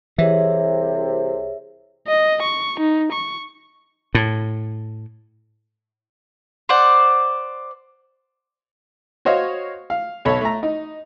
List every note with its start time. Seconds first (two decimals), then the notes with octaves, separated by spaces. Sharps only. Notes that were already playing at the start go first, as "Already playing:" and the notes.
0.18 C2 C3 E3 G#4 C#5 E5
2.07 D#5
2.42 C#6
2.80 D#4
3.13 C#6
4.15 A2
6.69 C5 D5 F#5
9.25 F#4 C5 C#5 D#5 F5
9.90 F5
10.25 B1 A4 C#5 B5
10.41 A3 A#5
10.63 D#4